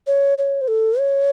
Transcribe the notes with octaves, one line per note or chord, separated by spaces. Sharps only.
C#5
C#5
C5
A4
C#5